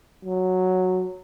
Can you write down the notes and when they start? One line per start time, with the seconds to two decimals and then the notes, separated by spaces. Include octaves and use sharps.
0.25 F#3